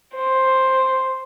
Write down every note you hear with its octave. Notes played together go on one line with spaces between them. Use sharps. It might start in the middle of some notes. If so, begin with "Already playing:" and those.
C5